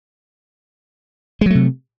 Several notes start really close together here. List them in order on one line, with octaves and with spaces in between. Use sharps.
G#3 F#3 A3 C3